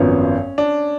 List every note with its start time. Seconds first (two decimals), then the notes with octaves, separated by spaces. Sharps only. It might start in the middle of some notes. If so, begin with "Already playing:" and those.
Already playing: G#1 F#2 F3 B3 C#4
0.58 D4